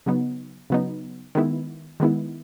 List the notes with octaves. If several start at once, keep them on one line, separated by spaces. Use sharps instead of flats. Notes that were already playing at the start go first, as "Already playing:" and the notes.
C#3 F#3 B3 D#4
C#3 F#3 B3 D#4
D#3 G#3 B3 E4
D#3 G#3 B3 E4